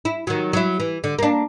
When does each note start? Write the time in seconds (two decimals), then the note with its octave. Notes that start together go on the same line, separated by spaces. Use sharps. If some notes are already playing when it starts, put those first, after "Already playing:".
0.05 E4
0.27 D#3 F#3
0.53 F#3 E4
0.80 E3
1.04 D3
1.19 A#3 D4